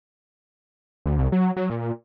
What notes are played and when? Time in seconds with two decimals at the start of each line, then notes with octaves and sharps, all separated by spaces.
1.06 D2
1.19 C2
1.32 F#3
1.56 F#3
1.70 A#2